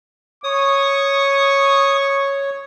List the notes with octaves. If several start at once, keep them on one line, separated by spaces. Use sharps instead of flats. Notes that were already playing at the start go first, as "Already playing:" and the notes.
C#5 C#6 D#6